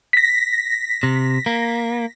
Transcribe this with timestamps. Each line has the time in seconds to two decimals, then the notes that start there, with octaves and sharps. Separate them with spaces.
0.13 A#6 B6
1.03 C3
1.46 A#3